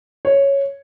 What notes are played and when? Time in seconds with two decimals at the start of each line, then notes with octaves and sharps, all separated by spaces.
0.25 C#5